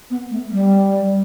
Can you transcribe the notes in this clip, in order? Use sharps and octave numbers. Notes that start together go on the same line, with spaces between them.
B3
A3
G3